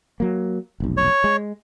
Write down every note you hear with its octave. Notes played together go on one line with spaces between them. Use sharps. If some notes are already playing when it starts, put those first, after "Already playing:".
F#3 A#3
F1 B1
C#5
G#3